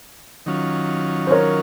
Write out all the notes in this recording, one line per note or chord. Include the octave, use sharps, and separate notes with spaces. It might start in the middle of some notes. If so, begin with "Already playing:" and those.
D#3 F#3 C#4 F4
C5
A#4 C#5